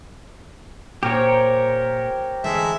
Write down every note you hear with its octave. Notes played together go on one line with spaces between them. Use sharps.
A#2 G4 A#4 C5 C#5
D3 E3 G#3 A3 E5